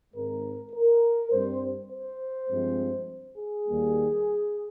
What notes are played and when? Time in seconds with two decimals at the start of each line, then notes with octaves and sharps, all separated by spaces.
0.13 G#2 D#3 G#3 C4 A#4
0.72 A#4
1.31 G2 G3 C4 C5
1.90 C5
2.49 G2 F3 G#3 C4
3.38 G#4
3.67 D#2 D#3 G3 A#3